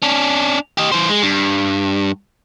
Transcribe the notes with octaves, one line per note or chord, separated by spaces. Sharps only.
C#4 D4
G4 D#5
E3 C5
G#3
G2